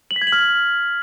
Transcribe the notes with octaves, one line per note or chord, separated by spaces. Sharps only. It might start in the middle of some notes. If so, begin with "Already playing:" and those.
F#7
B6
G#6
F#7
F6